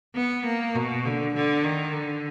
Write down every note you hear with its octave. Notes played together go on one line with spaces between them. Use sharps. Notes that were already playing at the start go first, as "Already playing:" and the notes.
B3
A#3
B2
D3
D3
D#3
D3